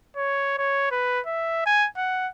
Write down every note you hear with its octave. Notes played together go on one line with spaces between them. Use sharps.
C#5
C#5
B4
E5
G#5
F#5